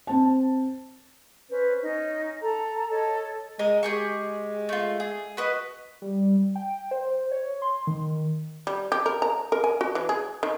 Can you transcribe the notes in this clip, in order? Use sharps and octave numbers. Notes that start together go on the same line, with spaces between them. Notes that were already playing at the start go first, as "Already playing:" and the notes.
C4 A5
C#4 B4 C5
C#4 D#4
A4 A#5
A4 C#5 D#5
G#3 A#4 D#5
G#3 G4 G#4 C#6
A3 F4
G#4
F#4 B4 D#5
G3
G5
C5
C#5
C6
D#3
G3
G4
A#4
A#5
A#4
G#5
F#4
E3
G#4
D#3